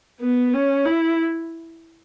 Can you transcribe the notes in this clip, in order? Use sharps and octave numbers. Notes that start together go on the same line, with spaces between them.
B3
C#4
E4